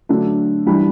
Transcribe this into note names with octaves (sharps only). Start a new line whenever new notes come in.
D3 F#3 A3 D4
E3 G3 D4 B5